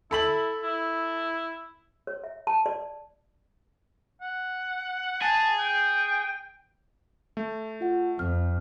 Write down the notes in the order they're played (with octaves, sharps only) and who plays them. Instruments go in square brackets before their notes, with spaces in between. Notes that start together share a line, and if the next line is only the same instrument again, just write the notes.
[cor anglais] E4 [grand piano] A4 B5 F#7
[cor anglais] E4
[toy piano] C#5
E5
A5
D5
[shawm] F#5
[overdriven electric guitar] G#4 [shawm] A5
[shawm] G5
[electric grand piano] A3
[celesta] F4 F#5
[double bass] F2 [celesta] F6